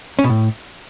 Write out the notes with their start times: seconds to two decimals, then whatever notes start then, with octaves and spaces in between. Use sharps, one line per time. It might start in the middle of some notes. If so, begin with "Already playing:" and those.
0.19 C#4
0.24 B2
0.30 A2